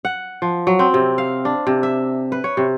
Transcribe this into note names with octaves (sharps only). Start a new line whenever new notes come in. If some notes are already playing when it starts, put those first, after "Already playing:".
F#5
F3
F#3
C4
C3
F5
D4
C3
E5
B4
C#5
C3